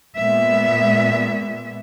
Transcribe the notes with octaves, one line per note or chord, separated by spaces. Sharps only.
A#2 G#3 B3 E5